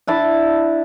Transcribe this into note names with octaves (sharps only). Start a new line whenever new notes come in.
D4 E4 A5